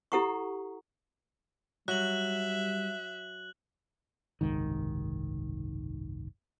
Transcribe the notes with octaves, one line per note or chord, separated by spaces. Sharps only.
E4 G4 A4 F#5 A#5 C#6
F#3 G3 E5 F#6 F#7
F#1 C2 G#2 D#3